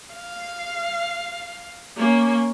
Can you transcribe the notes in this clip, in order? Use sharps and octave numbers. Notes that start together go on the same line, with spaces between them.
F5
A#3 C#4